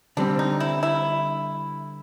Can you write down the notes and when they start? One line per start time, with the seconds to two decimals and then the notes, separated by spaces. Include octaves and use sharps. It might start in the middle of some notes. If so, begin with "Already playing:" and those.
0.17 D3 G3 C4 D4
0.39 D#4
0.60 E4
0.83 E4